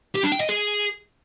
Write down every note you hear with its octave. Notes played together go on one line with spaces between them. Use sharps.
G4
D4
G5
D#5
G#4